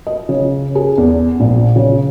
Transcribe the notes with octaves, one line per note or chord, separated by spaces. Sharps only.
D#5
C#3
G#4
E2
A#1
C#3